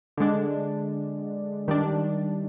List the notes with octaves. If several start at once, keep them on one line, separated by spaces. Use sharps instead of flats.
D3 G#3 D4
D#3 G3 D4